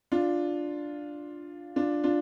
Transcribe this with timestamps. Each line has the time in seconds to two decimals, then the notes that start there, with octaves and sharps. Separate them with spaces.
0.12 D4 F4
1.76 D4 F4
2.04 D4 F4